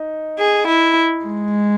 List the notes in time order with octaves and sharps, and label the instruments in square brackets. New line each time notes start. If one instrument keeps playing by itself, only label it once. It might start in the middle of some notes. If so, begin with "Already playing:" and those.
Already playing: [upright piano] D#4
[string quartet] G#4
E4
G#3